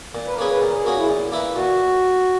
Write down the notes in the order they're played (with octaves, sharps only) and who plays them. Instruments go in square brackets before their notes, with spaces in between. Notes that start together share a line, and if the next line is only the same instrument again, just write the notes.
[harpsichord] A#2
[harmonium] B4
A#4
[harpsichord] A#3 C#4 G#4 [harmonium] B4
[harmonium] B4
[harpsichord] A#2 [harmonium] A#4
[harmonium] G#4
[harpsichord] A#3 C#4 G#4 [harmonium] F#4
[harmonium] E4
[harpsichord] A#2
A#3 E4 B4
[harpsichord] A#2 [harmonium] F#4